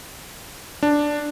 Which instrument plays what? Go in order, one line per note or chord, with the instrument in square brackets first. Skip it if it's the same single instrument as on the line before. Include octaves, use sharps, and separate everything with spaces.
[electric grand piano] D4